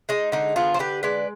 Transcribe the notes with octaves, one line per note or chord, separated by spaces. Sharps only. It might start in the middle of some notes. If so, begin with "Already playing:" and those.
G#3 D#4
D3 D#4
B3 F4 G#4
C5
D3 G4 B4
G#3 B4 D5